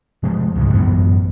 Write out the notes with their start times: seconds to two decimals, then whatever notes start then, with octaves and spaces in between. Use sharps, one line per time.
0.23 C3 F3 G#3 A3
0.55 C#2 G#2 D#3 G#3
0.74 A1 F#2 E3 B3